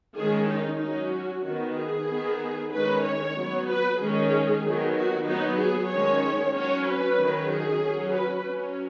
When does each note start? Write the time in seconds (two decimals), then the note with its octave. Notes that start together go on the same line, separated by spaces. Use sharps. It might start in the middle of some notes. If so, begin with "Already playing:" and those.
0.17 D#3 G#3 C#4 G#4
0.50 D#4
0.81 F#3 C#4 D#4
1.14 F#4
1.45 D#3 B3 F#4
1.77 G#4
2.09 D#3 B3
2.73 D#3 G#3 C#4 B4
3.04 C#5
3.37 F#3 B3
3.69 B4
4.01 D#3 G#3 C#4 G#4
4.64 D#3 F#3 B3
4.96 F#4
5.28 F#3 B3 D#4
5.60 G#4
5.92 D#3 G#3 C#4 C#5
6.56 F#3 C#4 C#5
6.88 B4
7.20 D#3 F#3 C#4
7.51 G#4
7.83 F#3 C#4
8.15 B4
8.47 F#3 C#4